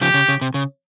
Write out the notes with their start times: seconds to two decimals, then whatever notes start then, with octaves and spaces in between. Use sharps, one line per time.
0.01 C#3 F3 G4
0.14 C#3
0.28 C#3
0.41 C3
0.54 C#3